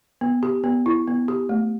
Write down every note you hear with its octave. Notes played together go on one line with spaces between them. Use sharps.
B3
G4
B3
E4
B3
G4
A3